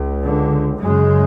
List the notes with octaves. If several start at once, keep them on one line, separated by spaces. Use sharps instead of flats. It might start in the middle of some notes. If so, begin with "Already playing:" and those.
Already playing: C#2
D3
F#2 C#3 G#3